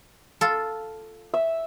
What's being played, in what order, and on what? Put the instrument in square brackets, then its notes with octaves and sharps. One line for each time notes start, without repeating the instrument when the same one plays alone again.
[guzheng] F4 A4
[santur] E5